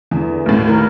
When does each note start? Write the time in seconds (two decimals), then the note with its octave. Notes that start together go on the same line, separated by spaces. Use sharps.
0.11 E2 D3 E3
0.46 D#2 A2
0.68 D#3 E4 A#4